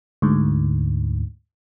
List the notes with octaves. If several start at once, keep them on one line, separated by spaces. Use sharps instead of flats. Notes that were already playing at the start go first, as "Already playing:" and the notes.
D2 G#2